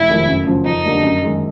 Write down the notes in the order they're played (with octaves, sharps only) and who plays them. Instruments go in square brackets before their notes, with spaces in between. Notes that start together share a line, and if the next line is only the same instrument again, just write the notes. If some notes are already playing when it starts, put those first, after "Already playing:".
Already playing: [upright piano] F1 [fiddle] E4
[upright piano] F2 C3 D#3 G#3
F#2
C#3 F3
[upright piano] F2 [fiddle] D#4
[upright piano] D3 G3 A#3 D4
F#2
D#3 G#3